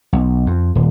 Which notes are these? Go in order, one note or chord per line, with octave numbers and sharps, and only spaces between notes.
B1
F2
D#1